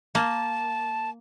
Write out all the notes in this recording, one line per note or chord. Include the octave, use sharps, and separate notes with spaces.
A#3 A5